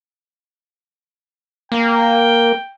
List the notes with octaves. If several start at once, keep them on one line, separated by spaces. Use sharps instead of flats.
A#3 G5